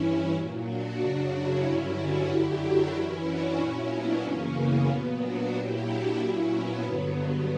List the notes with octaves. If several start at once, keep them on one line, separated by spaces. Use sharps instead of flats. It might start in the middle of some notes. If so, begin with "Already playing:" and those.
Already playing: G2 E3 C#4 E4
A#2 F#3
D4 F#4
F#2 C#3 F#3
C#4 E4
G2 D3 F#3 C#4 E4
D4 F#4
F#2 D3 F#3 E4 G4
D4 F#4
F#2 E3 C#4 E4
D4 F#4
A#2 F#3 C#4 E4
B3 D4
F#2 C#3 E3 A#3 C#4
B3
A#2 F#3 B3
D4 F#4
A#2 F#3 E4 G4
D4 F#4
A#2 F#3 C#4 E4
B3
G2 D3 F#3 B3